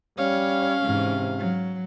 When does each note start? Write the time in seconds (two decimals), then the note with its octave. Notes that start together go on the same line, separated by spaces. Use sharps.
0.18 G3 C#4 C#5 F5
0.82 G#2 C3 E3
1.38 F#3